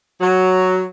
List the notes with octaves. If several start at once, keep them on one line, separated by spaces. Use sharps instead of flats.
F#3